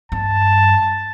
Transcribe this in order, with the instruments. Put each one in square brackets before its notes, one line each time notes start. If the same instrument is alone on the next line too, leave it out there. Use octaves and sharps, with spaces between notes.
[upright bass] G2 [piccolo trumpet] A5